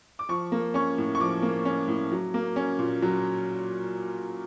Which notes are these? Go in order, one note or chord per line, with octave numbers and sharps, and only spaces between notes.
D6
F3 C#6
A#3
C#4 C#6
A2
C#6
F3 D6
A#3
C#4
A2
F#3
A#3
C#4
A#2
F#3